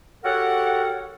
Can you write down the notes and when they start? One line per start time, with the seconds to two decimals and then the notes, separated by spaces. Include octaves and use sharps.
0.24 F#4 G4 A4 A#4 C#5 F#5